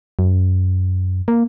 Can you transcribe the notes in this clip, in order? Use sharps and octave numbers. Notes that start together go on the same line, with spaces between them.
F#2
A#3